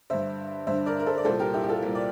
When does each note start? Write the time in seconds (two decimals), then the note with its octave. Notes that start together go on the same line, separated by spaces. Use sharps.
0.10 G2 D3 C5 E5
0.67 G2 D3 C5 E5
0.86 A#4 D5
1.00 A#4
1.06 A4 C5
1.18 D5
1.25 C2 A#2 A4 C5
1.39 G4 A#4
1.53 E4 G4
1.64 G4
1.68 F4 A4
1.83 C2 A#2
1.95 D5